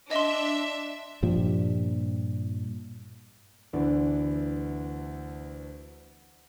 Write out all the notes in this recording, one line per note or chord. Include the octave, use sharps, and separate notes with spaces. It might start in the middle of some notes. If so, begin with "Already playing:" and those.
D4 D#5 E5 C6
G2 A#2 F3 G3
D2 D3 E3 B3 D4